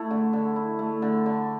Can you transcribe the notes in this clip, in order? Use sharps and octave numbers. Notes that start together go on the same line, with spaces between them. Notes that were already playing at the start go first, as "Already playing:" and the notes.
Already playing: A3 E4
D3
D3
E4
A3
D3
D3